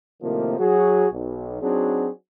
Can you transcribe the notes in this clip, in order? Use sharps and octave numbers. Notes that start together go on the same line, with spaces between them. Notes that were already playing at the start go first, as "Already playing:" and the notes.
A2 C3 D#3 F3 A#3
F#3 F#4 G#4
B1
F#3 C4 D4 D#4 F#4 G#4